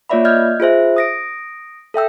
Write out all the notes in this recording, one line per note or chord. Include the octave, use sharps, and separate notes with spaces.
A#3 F4 C#5 D5 E5 B5
D#5 F6 G6 G#6
F4 G#4 C5 E5
D#6 A#6 D7
A4 E5 G5 E6